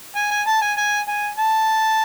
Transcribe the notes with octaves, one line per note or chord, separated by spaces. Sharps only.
G#5
G#5
A5
G#5
G#5
G#5
A5